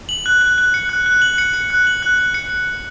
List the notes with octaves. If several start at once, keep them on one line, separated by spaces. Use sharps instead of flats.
F#7
F#6
F#6
F#6
C#7
F#6
F#6
F#7
C#7
C#7
F#6
F#7
F#6
F#6
C#7